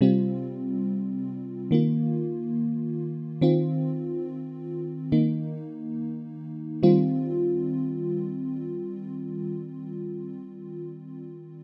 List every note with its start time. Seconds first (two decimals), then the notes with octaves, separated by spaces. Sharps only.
0.01 C3 G3 C4 F4
1.71 D#3 A#3 F4
3.41 D#3 C4 F4
5.12 D#3 A#3 D#4
6.83 D#3 G3 C4 F4